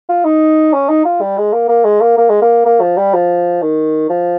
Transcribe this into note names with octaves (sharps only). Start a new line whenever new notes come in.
F4
D#4
C#4
D#4
F4
G3
G#3
A#3
A#3
G#3
A#3
A#3
G#3
A#3
A#3
F3
G3
F3
D#3
F3